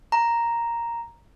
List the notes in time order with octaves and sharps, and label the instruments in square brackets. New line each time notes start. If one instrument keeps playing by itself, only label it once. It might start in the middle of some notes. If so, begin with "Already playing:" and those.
[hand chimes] A#5